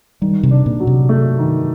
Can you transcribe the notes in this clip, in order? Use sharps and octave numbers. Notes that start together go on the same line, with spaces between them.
D#3 G3
C3
D4
A#2
F#3
C3
A3
D#3